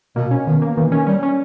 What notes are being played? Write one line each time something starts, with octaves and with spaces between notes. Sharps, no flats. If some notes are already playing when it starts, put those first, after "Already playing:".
B2 A#3
C#4
B2 D#3
A#3
D#3 E3
C#4
G3 C#4
C#4